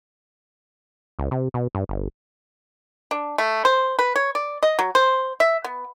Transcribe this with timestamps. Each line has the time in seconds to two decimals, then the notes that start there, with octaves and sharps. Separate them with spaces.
1.19 C#2
1.31 C3
1.54 B2
1.75 G2
1.89 G1
3.11 D4
3.38 A3
3.65 C5
3.99 B4
4.16 C#5
4.35 D5
4.63 D#5
4.79 F#3
4.95 C5
5.40 E5
5.64 B3